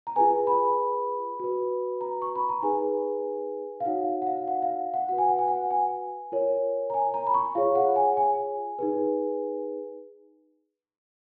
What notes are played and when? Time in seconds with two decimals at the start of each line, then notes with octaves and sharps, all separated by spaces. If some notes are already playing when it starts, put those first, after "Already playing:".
0.07 A#5
0.16 F4 G#4 B4 G#5
0.47 B5
1.40 F#4 B4
2.01 A#5
2.22 C#6
2.36 B5
2.49 A#5
2.63 D#4 G#4 B4 G#5
3.80 F5
3.86 D#4 F#4 C#5 F#5
4.22 F#5
4.27 F5
4.48 F#5
4.63 F5
4.94 F#5
5.09 F#4 B4 F#5
5.18 G#5
5.29 F#5
5.39 G#5
5.48 F#5
5.71 G#5
6.32 F4 A#4 C#5
6.90 A#5
6.94 G#5
7.14 A#5
7.27 B5
7.34 C#6
7.55 F4 G#4 C#5 F5
7.75 F#5
7.96 G#5
8.17 G#5
8.79 D#4 G#4 B4